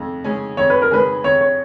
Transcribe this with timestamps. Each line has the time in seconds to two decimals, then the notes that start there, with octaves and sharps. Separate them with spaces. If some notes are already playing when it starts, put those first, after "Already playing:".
Already playing: F2 C#3
0.24 C#3 G#3 C#4 G#4
0.57 F2 C#5
0.70 B4
0.82 A#4
0.91 C#3 G#3 C#4 G#4 B4
1.24 F2 C#5
1.41 C#5